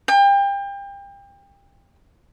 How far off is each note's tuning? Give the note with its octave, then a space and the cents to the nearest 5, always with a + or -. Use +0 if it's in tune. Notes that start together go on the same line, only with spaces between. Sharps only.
G5 +30